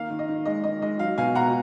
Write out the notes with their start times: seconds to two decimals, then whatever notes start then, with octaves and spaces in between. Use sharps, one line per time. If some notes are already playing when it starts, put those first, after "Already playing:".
Already playing: D#3 A#3 F5
0.10 D#3
0.19 D#5
0.28 D#3
0.46 G#3 D#5
0.64 D#3 D#5
0.82 G#3 D#5
0.99 F#3 F5
1.18 B2 F5 G#5
1.35 B2 F#5 A#5